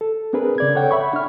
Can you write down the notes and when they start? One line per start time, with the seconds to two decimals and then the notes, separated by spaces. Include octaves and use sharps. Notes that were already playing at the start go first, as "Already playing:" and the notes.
0.01 A4
0.33 C4 D4 G#4 A#4 B4
0.58 C#3 D5 G#6
0.75 A4 C#5 F#5 G5
0.91 E5 B5 C#6
1.13 D4 F6